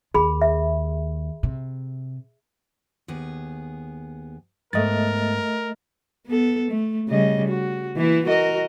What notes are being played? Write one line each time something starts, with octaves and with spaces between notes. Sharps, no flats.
D#2 G#4 B5
E5
C3
D#2 B3 G#4
G#2 A3 B3 A#4 D#5 A6
B3 A4
A3
C#3 G3 D#5
F#4
E3 A#3 E4
F#4 A#4 D#5